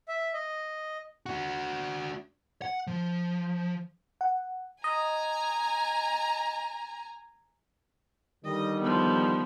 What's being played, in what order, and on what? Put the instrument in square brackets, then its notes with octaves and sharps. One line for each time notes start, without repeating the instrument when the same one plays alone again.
[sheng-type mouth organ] E5
D#5
[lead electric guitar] D4 F#4
F#5
F3
[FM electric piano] F#5
[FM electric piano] D#5 [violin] G#5 A#5
[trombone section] D3 D#3 G3 [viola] D#5
[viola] F3 B3